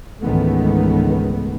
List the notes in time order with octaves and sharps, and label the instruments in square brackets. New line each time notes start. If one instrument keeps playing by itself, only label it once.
[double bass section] C#2 G#2 D#3 E3 A3 B3